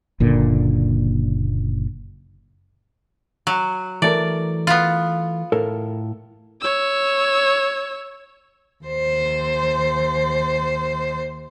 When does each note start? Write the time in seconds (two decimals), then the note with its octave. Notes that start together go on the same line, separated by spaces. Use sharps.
0.20 F#1 A#2 D3
3.47 F#3
4.02 E3 A3 A#4 D5
4.67 B3 F4
5.52 A2 A4 A#4
6.61 C#5 E6
8.84 D#2 C5